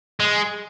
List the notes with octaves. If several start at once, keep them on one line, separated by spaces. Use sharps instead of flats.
G#3